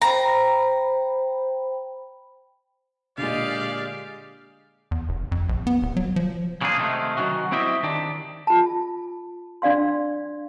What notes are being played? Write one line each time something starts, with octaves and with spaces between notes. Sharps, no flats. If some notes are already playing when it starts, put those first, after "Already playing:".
C5 G5 A#5 B5
A#2 D3 G#3 G4 D5 F5
E2
F1
F2
A#1
B3
D1
F#3
F3
C#3 A#3 C4 D4 G#4
C3 D#3 G#3 A3
D#3 F#3 C#4 F#4
C4 E4 G4 D#5 E5
D#3 D4 G4
F4 A5
D4 D5 F5 C6